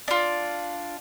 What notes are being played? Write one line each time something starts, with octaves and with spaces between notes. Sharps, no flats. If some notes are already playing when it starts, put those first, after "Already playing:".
D4 F4